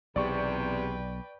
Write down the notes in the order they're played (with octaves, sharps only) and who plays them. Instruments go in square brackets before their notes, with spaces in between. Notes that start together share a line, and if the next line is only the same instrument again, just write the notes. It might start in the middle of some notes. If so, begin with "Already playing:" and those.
[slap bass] B1 [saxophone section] E2 C3 [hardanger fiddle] B4 G5 [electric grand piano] D5 C#6